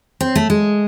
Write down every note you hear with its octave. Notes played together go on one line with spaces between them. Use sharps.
C4
A3
G#3